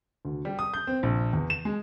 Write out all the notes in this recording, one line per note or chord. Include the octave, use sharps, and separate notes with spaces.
D2
G3
D#6
G6
C4
A#1
E2
E7
G#3